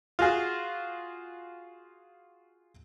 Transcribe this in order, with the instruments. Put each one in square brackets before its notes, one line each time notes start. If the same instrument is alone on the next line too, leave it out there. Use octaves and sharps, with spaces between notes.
[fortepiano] F4 F#4 G#4